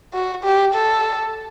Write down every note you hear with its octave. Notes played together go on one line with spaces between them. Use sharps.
F#4
G4
A4